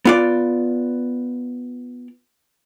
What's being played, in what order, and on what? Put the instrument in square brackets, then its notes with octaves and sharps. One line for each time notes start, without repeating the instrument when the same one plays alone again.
[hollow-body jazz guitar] B3 F4 D5